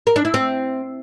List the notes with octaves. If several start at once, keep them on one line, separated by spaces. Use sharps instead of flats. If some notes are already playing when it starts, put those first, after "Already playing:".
A#4
D4
E4
C4